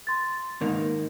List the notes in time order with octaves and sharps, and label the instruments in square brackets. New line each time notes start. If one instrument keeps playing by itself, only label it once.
[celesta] C6 A6
[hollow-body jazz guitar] G#2 D#3 A#3